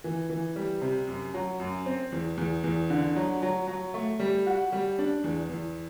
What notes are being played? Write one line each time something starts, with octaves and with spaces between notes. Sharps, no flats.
E3
E3
G3
C3
F#2
F#3
F#2
C4
E2
E2
E2
D3
F#3
F#3
F#3
A3
G3
F#4
G3
D4
E2
E2